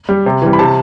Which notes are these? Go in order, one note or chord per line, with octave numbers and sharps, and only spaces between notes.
G3
C3
E3 G3
B5
C3 A5